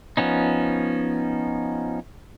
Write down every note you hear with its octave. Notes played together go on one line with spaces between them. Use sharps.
F3 B3 C#4 D#4